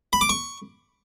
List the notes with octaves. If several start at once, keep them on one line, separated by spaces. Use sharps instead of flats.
B5
D6
C#6